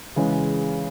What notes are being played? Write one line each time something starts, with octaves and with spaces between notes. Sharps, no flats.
C#3 E3 G#3